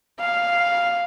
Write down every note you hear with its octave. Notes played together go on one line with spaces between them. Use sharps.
F5